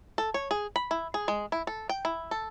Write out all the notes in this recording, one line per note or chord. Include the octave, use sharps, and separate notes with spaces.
A4
C#5
G#4
B5
E4
G#4
G#3
E4
A4
G5
E4
A4